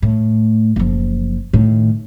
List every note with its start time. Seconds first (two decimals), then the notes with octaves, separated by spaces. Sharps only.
0.02 A2
0.76 F#1 F3
1.53 A2 D#3